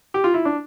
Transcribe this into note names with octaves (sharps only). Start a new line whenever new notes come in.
G4
F4
E4
D4